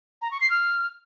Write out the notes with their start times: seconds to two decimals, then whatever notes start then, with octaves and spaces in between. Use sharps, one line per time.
0.22 A#5
0.31 C#6
0.41 C7
0.50 F6